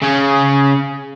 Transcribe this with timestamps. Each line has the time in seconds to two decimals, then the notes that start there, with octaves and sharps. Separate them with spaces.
0.02 C#3 C#4